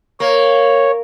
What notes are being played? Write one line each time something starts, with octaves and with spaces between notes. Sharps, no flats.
A#3 C#5